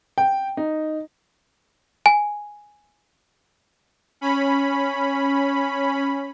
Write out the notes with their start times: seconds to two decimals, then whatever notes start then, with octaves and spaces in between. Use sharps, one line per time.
0.18 G5
0.57 D#4
2.06 G#5
4.21 C#4 B5